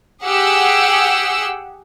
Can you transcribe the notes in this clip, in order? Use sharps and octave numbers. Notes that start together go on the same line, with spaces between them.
G4 G#4 F#5 E6